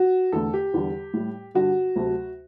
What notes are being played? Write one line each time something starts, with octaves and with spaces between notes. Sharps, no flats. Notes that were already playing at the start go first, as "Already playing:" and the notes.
Already playing: F#4
E2 D3 A3 A4
G4
E2 D3 G3
A2 G3
G2 D3 G3 F#4
D2 C3 F#3 A3